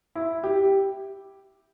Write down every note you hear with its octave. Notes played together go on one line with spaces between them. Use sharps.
E4
G4